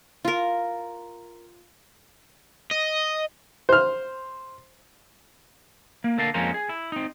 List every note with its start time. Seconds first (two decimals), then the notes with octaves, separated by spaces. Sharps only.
0.25 F4 A#4
2.71 D#5
3.69 C5 F6
6.04 A#3
6.18 D3 A#3 A#4 D5 F5 A5
6.34 F2 G#3 A#3 C#4 C5 A#5
6.54 G#4
6.69 E4
6.92 C4 D#4